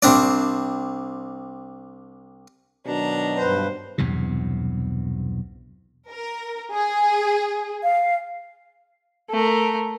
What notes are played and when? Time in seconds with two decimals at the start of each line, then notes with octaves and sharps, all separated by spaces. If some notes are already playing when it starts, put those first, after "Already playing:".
0.02 C2 C4 D4 D5
2.86 B2 D#3 F#3 D4 A#5
3.39 G2 B4 C5
3.98 B1 E2 G2 C3
6.11 A#4
6.73 G#4
7.83 F5
9.30 A3 A#4